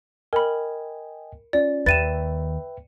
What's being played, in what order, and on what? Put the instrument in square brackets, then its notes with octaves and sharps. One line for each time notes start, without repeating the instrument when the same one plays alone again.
[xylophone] A#4 B5 [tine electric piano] D#5 G5 G#5
[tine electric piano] C#4 F4 [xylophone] D5
[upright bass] D#2 [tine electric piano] B4 E5 G5 [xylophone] A6 D#7 E7